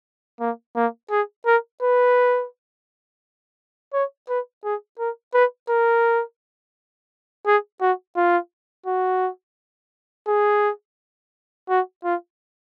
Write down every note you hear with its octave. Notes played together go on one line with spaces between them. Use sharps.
A#3
A#3
G#4
A#4
B4
C#5
B4
G#4
A#4
B4
A#4
G#4
F#4
F4
F#4
G#4
F#4
F4